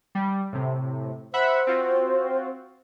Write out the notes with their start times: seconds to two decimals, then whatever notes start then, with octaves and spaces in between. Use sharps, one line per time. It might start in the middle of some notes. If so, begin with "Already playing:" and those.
0.15 G3
0.53 A2 C3
1.34 C5 E5 F#5 B5
1.67 C4 F4 F#4